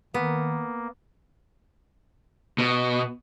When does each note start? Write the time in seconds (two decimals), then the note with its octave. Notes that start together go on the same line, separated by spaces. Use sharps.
0.14 D#3 A#3 B3
2.58 B2